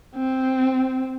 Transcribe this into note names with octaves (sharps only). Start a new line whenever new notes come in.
C4